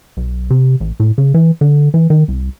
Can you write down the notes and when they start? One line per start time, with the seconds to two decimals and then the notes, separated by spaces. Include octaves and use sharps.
0.17 B1
0.50 C3
0.80 A1
1.00 A2
1.18 C#3
1.34 E3
1.61 D3
1.94 E3
2.10 D#3
2.28 C2